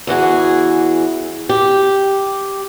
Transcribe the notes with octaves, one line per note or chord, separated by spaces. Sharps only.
E2 E3 F#4 G#4
G4